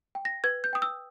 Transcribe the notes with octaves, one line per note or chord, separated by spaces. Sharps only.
G5
A#6
B4 G#6
G6
G5 D#6
E6